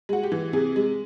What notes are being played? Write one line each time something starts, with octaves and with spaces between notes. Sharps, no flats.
G#3 F#4
G4
E3
C3 G#4
G#3